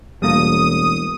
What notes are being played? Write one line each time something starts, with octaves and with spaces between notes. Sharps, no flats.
E1 G3 A3 A#3 D#6